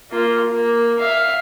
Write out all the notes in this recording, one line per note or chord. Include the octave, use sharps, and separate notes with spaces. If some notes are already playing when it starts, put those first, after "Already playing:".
A#3 F4
A#3
E5 F5